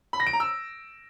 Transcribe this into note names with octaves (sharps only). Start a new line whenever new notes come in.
B5
A#6
D7
A#5
E6